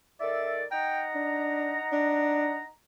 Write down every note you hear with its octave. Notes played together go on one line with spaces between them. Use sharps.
D#3 A4 D5 E5
D#4 F#5 G5 A#5
D4
D4